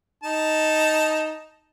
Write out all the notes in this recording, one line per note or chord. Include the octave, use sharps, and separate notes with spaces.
D#4 A5